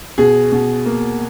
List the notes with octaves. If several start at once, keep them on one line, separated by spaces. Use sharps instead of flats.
B2 G#4
B2
A#3